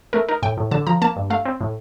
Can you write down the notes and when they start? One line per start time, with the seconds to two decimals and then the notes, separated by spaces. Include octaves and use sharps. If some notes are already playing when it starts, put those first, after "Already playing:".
0.13 A3 A#4
0.29 D#4 A#4
0.43 A2 G5
0.57 A2
0.71 D3 A5
0.87 F3 A#5
1.02 A#3 A5
1.16 G2
1.30 A3 F5
1.45 C4
1.61 A2